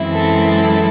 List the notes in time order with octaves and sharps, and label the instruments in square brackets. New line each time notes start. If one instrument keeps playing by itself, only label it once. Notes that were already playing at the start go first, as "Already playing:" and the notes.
Already playing: [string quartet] F#2 E3 G#3 C4 E4
A4
A4